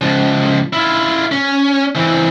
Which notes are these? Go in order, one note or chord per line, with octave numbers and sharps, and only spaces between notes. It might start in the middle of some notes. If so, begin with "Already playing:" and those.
C#2 F3
E4 F4
C#4
E3 C4